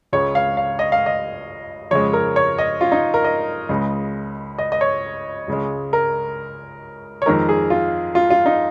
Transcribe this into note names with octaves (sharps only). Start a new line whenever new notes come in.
C#2 C#3 G#3 C#5
F5
F5
D#5
F5
D#5
F2 C#3 G#3 C#5
A#4
C#5
D#5
F4
D#4
A#4
D#5
C#2 C#3 G#3
D#5
D#5
C#5
C#2 C#3 G#3
A#4
C#5
F2 D#3 G#3 A#4
G#4
F4
F4
F4
D#4